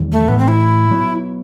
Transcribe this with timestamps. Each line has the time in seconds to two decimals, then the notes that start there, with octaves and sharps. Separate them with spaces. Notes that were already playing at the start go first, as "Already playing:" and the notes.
Already playing: E2 D#3 G3 B3
0.12 A3
0.28 A2 E3 A3 B3
0.39 C4
0.48 E4
0.91 F#3 B3